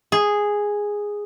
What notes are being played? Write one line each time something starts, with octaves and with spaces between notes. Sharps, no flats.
G#4